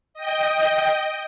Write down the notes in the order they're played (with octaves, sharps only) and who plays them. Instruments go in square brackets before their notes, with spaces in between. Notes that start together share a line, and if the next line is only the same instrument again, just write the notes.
[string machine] D#5 G5